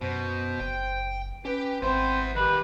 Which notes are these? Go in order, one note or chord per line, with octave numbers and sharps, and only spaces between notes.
F#2 B2 C5
F#1 G5
C#4 G4 B4 G5
G#1 B3 C4 E4 C5
D#3 G3 G4 B4